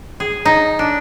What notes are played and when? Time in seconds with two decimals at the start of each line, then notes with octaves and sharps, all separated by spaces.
0.20 G#4
0.45 D#4
0.79 D4